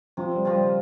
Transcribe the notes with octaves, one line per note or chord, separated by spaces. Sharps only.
C3 F3
G3
F3 C4 F4
G3